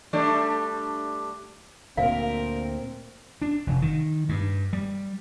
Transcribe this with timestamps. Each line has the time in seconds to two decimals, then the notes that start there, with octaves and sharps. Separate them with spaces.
0.13 G3 A3 D4
1.97 D2 A#2 A#3 C4 A#4 F5
3.42 D4
3.67 F1
3.82 D#3
4.29 G2
4.73 G3